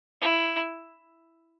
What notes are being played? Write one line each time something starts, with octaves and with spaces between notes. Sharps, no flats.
E4